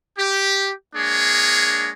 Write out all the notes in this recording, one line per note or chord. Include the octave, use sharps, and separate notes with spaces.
G4
G#3 A#3 D4 G#4 C#5